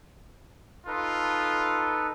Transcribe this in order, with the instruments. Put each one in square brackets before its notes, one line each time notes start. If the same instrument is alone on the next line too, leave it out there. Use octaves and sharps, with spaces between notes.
[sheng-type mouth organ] D#4 A4 B4 [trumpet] F4